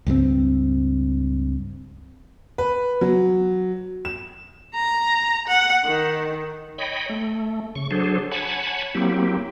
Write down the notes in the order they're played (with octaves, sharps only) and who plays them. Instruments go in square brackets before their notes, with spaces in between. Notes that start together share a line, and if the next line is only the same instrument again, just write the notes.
[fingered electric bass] C#2 G2 F3 C4
[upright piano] B4
F#3
E7
[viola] A#5
F#5
D#3
[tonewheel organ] C#5 D#5 G5 B5
A3
C#3 C#6
F#3 D4 G#4 A4 C5
C#5 F#5 G#5 A5 B5
F#3 A#3 C4 E4 G4